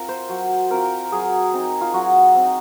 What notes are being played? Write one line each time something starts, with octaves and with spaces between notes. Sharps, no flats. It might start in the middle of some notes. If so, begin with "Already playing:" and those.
Already playing: C4 F4 A#4
C5
F#3
C4 F4 A#4
F#3 G#4
C4 D#4
F4
F#3 F#4
C4 D#4